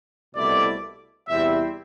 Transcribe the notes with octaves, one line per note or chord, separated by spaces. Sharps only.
C2 B2 A3 E4 D5
E2 C3 G3 C4 E4 E5